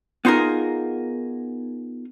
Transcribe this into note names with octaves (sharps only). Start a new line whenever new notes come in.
B3 D#4 F4 G#4 A#4